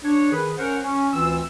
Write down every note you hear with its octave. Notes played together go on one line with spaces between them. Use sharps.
D4 C#5
D#3 G#4 B4
C#4 A#4 C5 F#5
C#4
D2 E3 C4 F4 E6